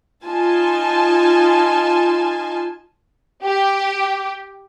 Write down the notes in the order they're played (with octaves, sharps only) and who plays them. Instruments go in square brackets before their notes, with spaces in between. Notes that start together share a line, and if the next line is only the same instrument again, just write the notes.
[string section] D#4 F4 G#5 A5
G4